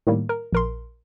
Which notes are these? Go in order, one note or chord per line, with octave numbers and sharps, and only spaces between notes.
A2 D#3 G3 A#3
A#4
A#1 A#4 C6